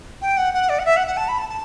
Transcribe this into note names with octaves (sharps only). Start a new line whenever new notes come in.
G5
F#5
F#5
D5
F#5
E5
F#5
F#5
A5
B5
A5
A5